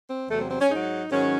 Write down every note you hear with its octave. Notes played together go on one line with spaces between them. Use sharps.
C4
E2 C3 F#3 A3
C4
C4
C#4
G#2 F#3 D#4
G#2 D#3 F#3 C#4